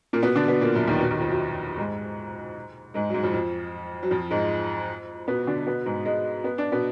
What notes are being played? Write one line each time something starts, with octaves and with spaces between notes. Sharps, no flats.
A#2 A#3
B2 B3
D3 D4
B2 B3
A#2 A#3
F#2 F#3
D#2 D#3
B2
D#2 D#3
F2 F3
F#2 F#3
G#2 G#3
G#2 G#3
F#3
G#2 G#3
F2 F3
F2 F3
F#3
F2 F3
G#2 G#3
B2 B3
D3 D4
B2 B3
G#2 G#3
G#2 G#3
B3
D4
B2 B3